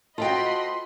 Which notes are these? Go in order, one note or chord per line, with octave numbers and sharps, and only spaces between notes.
F4 F#4 A4 C5 D#5 G5 B5 C6